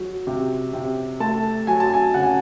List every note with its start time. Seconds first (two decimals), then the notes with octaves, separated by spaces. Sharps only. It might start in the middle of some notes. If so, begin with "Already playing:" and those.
Already playing: F#3
0.27 C3
0.73 C3
1.20 A3 A5
1.67 F#3 G#5
1.80 A5
1.94 G#5
2.14 C#3 F#5
2.23 G#5